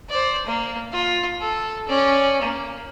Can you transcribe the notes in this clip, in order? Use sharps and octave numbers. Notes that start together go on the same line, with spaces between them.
C5 D5
A#3
F4
A4
C#4 D5
A#3